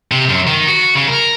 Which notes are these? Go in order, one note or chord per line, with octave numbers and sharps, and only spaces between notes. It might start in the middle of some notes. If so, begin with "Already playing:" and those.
C3
F#2
D#3
F#4
C#3
A#4